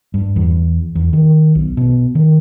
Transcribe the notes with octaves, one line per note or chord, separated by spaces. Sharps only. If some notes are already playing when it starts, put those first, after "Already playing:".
G2
E2
E2
D#3
B1
B2
D#3